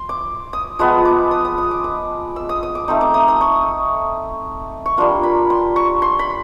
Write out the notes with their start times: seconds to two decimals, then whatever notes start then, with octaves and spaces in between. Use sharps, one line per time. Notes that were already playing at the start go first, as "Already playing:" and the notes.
Already playing: C6
0.09 D6
0.53 D#6
0.79 F3 G#3 B3 D#6
1.05 D6
1.31 D#6
1.45 D#6
1.58 D#6
1.71 D6
1.84 D6
2.36 E6
2.49 D#6
2.63 D#6
2.75 D6
2.88 A3 C4 D#4
3.01 D6
3.14 D#6
3.28 D#6
3.41 C#6
4.86 C#6
4.97 G3 A#3 D4 F4 C6
5.23 B5
5.50 C6
5.76 C#6
6.02 C6
6.19 B5